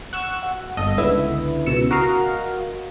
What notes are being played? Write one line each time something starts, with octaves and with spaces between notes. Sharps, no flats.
F#5 C#6 E6
F#4
G1 A4 D#5
C#2 D3 B3 E4 E5
C#2 B2 E6 C#7
F#4 A#4 D#5 F5